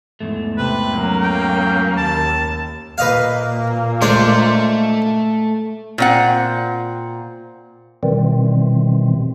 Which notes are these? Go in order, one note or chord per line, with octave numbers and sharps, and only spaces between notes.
E2 G#2 A3
C3 B4
F#3 A#3 C#4
F#3 G5
D#2 A5
A#2 A#3 B4 D#5 F5
G#3 A3 D4 C5
A#2 C4 F#5
B2 D#3 E3 G3 C4